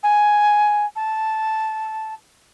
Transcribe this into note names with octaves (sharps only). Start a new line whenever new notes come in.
G#5
A5